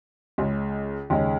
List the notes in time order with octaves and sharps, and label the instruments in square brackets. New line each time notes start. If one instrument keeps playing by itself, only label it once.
[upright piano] C#2 C#3 G#3
D#2 C#3 G#3 D#4